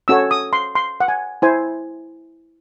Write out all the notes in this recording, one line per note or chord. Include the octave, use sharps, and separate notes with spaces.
C#4 F#4 A4 C#5 E6
D#6
C6
C6
F#5
G#5
E4 C5 G#5